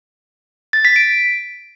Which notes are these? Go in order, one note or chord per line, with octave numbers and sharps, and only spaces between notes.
A6
B6
D7